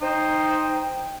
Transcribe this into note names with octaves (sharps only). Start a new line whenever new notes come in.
D#4 C5 G5